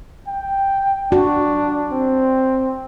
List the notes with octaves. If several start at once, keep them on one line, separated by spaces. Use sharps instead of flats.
G5
D4 F#4
C4